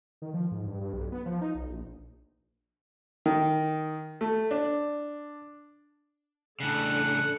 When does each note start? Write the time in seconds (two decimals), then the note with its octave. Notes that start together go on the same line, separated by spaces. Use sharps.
0.22 D#3
0.34 F3
0.51 G#2
0.67 G2
0.81 G2
0.93 B1
1.12 B3
1.26 F3
1.41 D#4
1.55 B1
1.70 A#1
3.26 D#3
4.21 A3
4.51 D4
6.60 A2 C#3 D4 A4 F#5